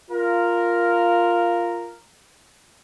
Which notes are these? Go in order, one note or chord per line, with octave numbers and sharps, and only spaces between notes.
F4 A#4